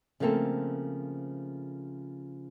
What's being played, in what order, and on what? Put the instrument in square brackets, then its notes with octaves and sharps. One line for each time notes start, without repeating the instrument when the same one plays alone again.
[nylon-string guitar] C#3 F3 A3 A#3 C4 A4